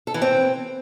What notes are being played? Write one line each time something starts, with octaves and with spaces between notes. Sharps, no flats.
A4
E3
C4